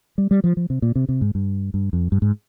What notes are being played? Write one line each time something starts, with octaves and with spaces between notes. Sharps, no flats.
G3
G3
F3
F3
C3
A#2
C3
C3
G#2
G2
G2
F2
G2
G#2